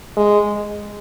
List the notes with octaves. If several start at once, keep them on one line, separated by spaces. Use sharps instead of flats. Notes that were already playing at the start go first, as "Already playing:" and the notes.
G#3